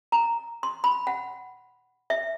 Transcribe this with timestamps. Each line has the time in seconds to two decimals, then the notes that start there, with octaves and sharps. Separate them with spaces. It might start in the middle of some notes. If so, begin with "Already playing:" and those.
0.12 A#5
0.63 C6
0.84 B5
1.07 F#5
2.10 E5